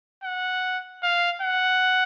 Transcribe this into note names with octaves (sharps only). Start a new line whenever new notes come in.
F#5
F5
F#5